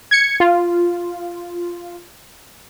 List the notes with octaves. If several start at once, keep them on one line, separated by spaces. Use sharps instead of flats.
G#6 C#7
F4